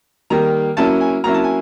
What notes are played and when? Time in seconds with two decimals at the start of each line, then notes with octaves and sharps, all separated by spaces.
0.30 D#3 G3 A#3 A#5
0.77 F#3 A#3 C#4 E4 A5
1.01 G#5
1.24 F#3 A#3 C#4 E4 A#5
1.34 A5
1.44 G#5